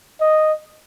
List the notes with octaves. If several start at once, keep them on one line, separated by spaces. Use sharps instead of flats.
D#5